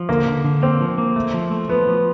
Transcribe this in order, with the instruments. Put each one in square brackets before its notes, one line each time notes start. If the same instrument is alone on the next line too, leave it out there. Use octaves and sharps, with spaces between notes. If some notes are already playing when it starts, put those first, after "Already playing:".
Already playing: [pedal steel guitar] F3
[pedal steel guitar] D3 [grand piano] A#3
[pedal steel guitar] D3
D3
[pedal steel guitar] A#3 [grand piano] C4
[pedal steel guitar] F3
A#3
A3
F3
A3
[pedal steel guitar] F3 [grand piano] B3
[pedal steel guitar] F3